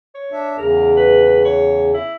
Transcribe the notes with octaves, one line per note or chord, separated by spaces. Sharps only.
C#5
D4 E5
E2 C#3 A#4
B4
C#5
E4